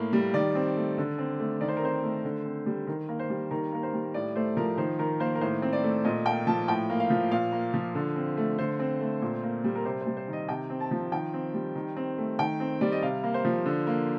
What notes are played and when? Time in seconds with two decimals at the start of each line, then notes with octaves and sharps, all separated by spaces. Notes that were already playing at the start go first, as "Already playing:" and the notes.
Already playing: A2 A#3 F5
0.13 G3
0.34 D#3 D5
0.55 C4
0.76 A3
0.98 D3
1.18 C4
1.39 A3
1.61 D#3 D5
1.68 C5
1.77 A#4
1.82 C4 C5
2.03 A3
2.24 D3
2.45 C4
2.66 G3
2.87 D#3 A#4
3.09 A#3
3.19 C5
3.30 G3
3.51 D#3 A#4
3.72 A#3 A#4
3.83 C5
3.93 G3
4.14 A2 D5
4.36 A3 C5
4.57 F3 A#4
4.77 D#3 C5
4.99 D#3 A#4
5.20 A#3 C5
5.35 A#4
5.41 A2 C5
5.62 C4
5.73 D5
5.84 A3
6.05 A#2 D#5
6.26 A#3 G5
6.47 F3 A5
6.68 A2 G5
6.90 A#3
7.00 F5
7.10 F3
7.31 A#2 F5
7.52 A#3
7.74 F3
7.95 D3
8.16 C4
8.37 A3
8.58 D3 C5
8.79 C4
9.00 A3
9.22 A#2
9.43 A#3
9.64 G3
9.75 A#4
9.85 C3 C5
10.01 C5
10.07 G3
10.17 C5
10.28 D#3
10.33 D#5
10.48 C3 G5
10.70 C4
10.80 A5
10.91 F3
11.12 D#3 G5
11.34 C4
11.54 G3
11.76 D#3
11.96 C4
12.18 A3
12.39 D#3 G5
12.60 C4
12.81 G3 D5
12.92 D#5
13.02 C3 F5
13.23 A#3
13.34 C5
13.45 F3
13.65 D3
13.87 A#3